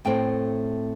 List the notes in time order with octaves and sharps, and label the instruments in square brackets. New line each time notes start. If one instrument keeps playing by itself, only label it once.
[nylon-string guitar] A2 A3 C4 G5